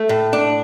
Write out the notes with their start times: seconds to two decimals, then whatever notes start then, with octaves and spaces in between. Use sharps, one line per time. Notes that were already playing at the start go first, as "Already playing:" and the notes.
Already playing: A3
0.09 A2
0.33 D4